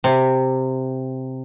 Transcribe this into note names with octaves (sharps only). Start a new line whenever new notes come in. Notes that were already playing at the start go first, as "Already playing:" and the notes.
C3